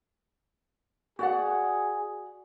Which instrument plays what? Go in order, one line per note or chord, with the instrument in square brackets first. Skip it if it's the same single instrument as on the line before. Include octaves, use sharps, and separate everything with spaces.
[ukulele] F#4 D5 F#5 [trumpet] G#4